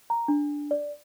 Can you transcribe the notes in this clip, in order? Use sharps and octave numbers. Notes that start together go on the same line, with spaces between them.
A#5
D4
D5